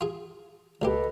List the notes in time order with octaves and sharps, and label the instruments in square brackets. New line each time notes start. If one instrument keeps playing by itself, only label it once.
[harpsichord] F4 G#4
[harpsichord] C#2 A#3 G4 [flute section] A4 B4 D#5